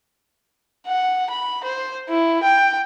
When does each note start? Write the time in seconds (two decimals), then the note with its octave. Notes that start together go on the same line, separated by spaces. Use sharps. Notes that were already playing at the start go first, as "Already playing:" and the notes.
0.88 F#5
1.30 B5
1.64 C5
2.09 E4
2.44 G5